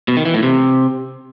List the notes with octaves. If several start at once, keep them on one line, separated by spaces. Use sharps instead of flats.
B2
D#3
E3
A2
C3